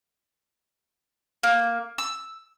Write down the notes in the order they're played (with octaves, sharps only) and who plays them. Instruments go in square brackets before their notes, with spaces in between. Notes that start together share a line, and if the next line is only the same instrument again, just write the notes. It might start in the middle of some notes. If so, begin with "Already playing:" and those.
[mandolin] A#3
E6